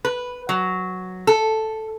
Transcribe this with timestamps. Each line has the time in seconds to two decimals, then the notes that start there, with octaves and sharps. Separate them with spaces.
0.05 B4
0.49 F#3
1.27 A4